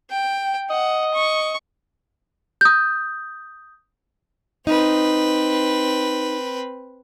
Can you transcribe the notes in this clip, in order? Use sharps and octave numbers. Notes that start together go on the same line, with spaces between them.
G5
D#5 F#5
C#6
D#6 G6
C4 D#4 B4